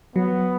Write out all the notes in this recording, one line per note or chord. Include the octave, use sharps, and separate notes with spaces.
F#3 B3